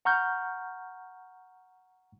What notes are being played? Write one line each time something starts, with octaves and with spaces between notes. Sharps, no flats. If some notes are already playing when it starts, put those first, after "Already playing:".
F#5 A#5 C#6 F6 G6